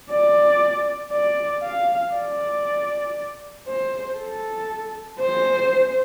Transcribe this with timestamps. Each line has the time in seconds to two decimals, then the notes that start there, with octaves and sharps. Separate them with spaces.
0.10 D5
1.12 D5
1.63 F5
2.14 D5
3.67 C5
4.18 A4
5.20 C5